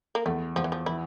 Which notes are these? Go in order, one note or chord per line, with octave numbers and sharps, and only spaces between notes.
A#3
E2 A3
E2 F3
E3
F3
E3 E4